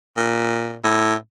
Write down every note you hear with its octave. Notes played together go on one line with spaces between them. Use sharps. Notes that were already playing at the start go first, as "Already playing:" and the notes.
A#2
A2